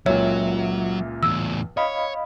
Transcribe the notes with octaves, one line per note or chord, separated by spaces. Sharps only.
C#2 A#2 F#3 C#5 E5
E2 A2 E6
C#5 D#5 F5 B5